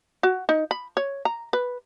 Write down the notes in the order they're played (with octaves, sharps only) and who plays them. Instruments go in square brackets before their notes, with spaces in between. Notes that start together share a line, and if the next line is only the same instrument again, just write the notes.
[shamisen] F#4
D#4
B5
C#5
A#5
B4